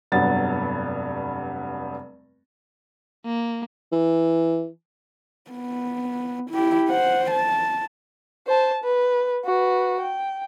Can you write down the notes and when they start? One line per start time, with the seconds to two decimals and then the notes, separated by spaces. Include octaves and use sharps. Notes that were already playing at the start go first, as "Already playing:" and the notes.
0.12 F1 G2 F#3 B3 A6
3.25 A#3
3.92 E3
5.51 B3
6.51 E4 G4
6.89 C5 F#5
7.31 A5
8.47 C5 A5
8.83 B4
9.46 F#4 B4
10.01 G5